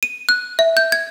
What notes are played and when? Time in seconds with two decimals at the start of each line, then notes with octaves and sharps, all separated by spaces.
0.03 D#7
0.29 F#6
0.59 E5
0.77 G6
0.92 G#6